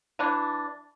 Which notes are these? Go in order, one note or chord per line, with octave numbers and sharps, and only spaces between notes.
E3 D4